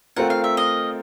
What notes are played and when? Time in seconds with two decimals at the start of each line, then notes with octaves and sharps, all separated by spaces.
0.16 A3 C4 F4 A#4 F#5
0.30 F5
0.44 E5
0.57 D#5 F5